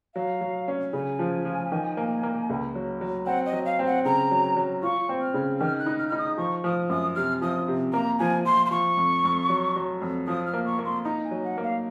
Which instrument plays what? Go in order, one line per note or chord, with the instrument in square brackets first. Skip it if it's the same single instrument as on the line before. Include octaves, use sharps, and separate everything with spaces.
[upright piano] F#3 [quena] F5
[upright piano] F#3
C#4
[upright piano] C#3 [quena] G#5
[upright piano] F3
F3
D#3
A#3
A#3
C#2
F#3
F#3
[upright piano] C4 [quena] F#5
[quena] D#5
[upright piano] F#3
[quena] F5
[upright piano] C4
[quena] F#5
[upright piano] C#3 [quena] A#5
[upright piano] F#3
F#3
[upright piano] F4 [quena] C#6
[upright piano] C4
[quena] F6
[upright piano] C#3
[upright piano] D#3 [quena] F6
[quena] F#6
[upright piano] D#4
[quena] F6
[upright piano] D#4 [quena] F6
[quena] D#6
[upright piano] F3 [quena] C#6
[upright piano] F3 [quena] D#6
[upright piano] F#2 [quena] D#6
[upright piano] C3 [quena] F6
[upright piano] F3 [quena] D#6
[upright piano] C3
[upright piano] A#3 [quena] A#5
[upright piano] F3 [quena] G#5
[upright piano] F3 [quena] C6
[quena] C6
[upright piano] F3 [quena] C#6
[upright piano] F2
F2
F#3
F#3
F2
[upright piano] F3 [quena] D#6
[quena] F6
[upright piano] A#3
[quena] C#6
[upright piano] A#3
[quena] C6
[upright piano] D#4 [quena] A#5
[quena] G#5
[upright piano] F#3
[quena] F#5
[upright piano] A#3
[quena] F5